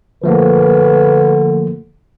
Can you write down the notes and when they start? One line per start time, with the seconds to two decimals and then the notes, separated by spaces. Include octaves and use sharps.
0.24 D3 F3 A3 A#3 B4